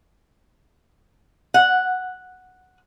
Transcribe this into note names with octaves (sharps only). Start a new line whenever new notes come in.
F#5